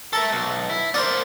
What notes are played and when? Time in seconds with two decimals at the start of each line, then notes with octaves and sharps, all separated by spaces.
0.13 A4 A#4 E5 A5
0.32 B1
0.70 E4
0.94 B3 A#4 C5 D5